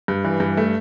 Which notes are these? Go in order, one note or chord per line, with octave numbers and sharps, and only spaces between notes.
G2
E3
G2
A3